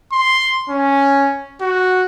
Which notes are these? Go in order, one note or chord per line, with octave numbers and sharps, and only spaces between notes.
C6
C#4
F#4